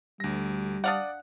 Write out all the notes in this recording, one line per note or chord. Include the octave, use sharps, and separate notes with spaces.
D2 G3 A#6
D4 D5 F5 F#5 D#6